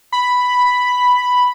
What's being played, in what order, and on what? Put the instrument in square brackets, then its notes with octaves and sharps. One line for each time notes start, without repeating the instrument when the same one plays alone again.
[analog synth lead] B5